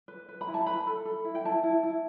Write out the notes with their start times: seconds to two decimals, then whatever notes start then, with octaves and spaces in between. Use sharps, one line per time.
0.08 B4
0.29 B4
0.41 B5
0.48 E4
0.54 A5
0.66 B4 B5
0.87 A4
1.05 A4
1.24 E4
1.35 G5
1.45 E4 A5
1.63 E4
1.83 E4